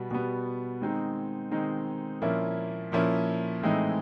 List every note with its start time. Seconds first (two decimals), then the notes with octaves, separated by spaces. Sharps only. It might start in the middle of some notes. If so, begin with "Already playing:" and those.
Already playing: B2 G3 B3
0.11 B2 G3 B3
0.81 D#3 G#3 C4 D#4
1.51 D#3 G#3 C4 D#4
2.22 A#2 F3 A#3 C#4 E4
2.92 A#2 F3 A#3 C#4 E4
3.62 A2 E3 G#3 C4 D#4